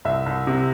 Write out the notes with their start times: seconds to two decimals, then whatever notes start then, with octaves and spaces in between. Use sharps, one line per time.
0.05 C2 E5
0.26 C2
0.47 C3